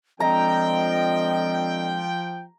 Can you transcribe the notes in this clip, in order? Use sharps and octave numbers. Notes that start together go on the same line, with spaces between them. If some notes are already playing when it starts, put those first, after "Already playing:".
D3 F3 G#3 C4 D#5 G5 A#5